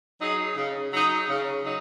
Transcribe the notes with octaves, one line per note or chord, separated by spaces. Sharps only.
F#3 D#4 G#4
C#3
F#3 D#4 G#4
C#3
F#3 D#4